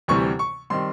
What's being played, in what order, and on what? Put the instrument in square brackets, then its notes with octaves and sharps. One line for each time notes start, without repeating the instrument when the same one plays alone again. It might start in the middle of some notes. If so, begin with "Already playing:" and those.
[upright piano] D2 C3 E3 G3 C#6
C#6
D#3 G3 C4 C6